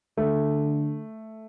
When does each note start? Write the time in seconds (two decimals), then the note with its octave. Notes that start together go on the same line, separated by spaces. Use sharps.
0.17 D3 A3